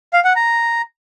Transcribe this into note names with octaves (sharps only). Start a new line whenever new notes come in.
F5
F#5
A#5